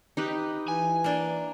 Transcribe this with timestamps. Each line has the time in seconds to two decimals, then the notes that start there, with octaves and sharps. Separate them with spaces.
0.17 D#4 G4 B4
0.68 E3 G#5
1.04 A#3 D4